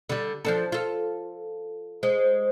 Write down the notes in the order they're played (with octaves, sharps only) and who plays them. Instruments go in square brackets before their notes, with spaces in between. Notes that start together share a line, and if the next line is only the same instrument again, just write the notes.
[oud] D3 G3
F3 D4 A4
F4 A4
[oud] G#3 [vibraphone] C5